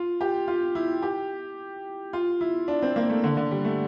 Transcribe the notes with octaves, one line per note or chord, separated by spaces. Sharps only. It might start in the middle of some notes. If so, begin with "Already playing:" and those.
Already playing: F4
G4
F4
E4
G4
F4
E4
D4
C4
A#3
A3
D3
D3
G3
A3